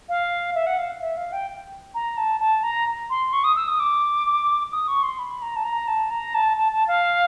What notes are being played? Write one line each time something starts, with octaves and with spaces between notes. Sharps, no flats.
F5
E5
F#5
F5
E5
F5
G5
A#5
A5
A5
A#5
C6
C#6
D#6
E6
D#6
D6
D#6
C#6
C6
B5
A#5
A5
A#5
A5
A#5
A5
A5
A5
F5